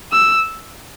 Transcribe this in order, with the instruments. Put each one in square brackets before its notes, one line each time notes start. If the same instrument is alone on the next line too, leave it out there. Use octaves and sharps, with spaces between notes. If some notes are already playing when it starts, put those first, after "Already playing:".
[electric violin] E6